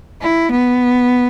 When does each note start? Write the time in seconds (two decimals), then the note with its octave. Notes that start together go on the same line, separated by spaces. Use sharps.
0.21 E4
0.51 B3